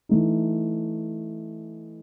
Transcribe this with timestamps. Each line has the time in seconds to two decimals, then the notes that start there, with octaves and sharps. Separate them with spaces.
0.09 E3 A3 D#4